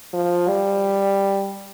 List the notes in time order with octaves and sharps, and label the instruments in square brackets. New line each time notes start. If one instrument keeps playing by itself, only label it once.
[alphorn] F3
G3